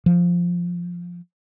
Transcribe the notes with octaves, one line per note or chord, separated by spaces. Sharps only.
F3